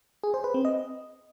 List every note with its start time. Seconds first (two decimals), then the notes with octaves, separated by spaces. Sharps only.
0.24 G#4
0.34 C5
0.44 B4
0.54 C4
0.65 D#5